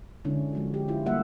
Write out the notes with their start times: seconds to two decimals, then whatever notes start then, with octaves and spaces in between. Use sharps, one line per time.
0.25 D3 G#3 C#4 D4 E4
0.53 F3 G#3 F#4
0.74 G4
0.88 E4 F4
1.06 G3 A3 A#3 G4 E5 F#5